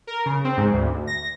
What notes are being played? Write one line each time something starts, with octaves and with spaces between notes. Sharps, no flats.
A#4
C#3
C4
G#2
D2
A#6